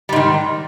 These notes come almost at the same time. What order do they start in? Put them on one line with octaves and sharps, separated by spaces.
G3 G#2 D#3